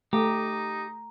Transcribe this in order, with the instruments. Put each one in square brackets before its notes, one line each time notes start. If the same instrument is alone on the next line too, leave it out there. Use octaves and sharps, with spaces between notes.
[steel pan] A3 [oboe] D#4 [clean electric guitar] G4 [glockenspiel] A#5